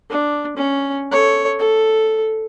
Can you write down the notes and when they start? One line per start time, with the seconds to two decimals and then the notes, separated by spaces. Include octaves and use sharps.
0.10 D4
0.57 C#4
1.12 A4 C#5
1.59 A4